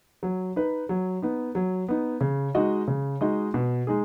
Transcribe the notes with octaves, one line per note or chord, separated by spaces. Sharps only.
F#3
D#4 B4
F#3
B3 D#4
F#3
B3 D#4
C#3
G#3 D#4 F#4 D#5
C#3
G#3 D#4 F#4 D#5
B2
G#3 D#4 G#4